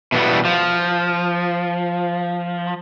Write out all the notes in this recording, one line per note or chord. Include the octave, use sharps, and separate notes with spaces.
B2 E3 G3 B3
F3